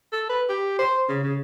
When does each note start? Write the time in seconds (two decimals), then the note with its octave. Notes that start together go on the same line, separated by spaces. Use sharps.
0.13 A4
0.29 B4
0.49 G4
0.79 C5
1.09 C#3
1.23 C#3